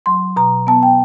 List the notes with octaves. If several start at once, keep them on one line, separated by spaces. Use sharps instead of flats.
F#3 C6
B2 A#5
B3 A5
G5